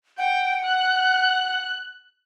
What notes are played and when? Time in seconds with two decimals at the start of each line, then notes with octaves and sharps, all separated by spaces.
0.18 F#5 G5
0.65 F#6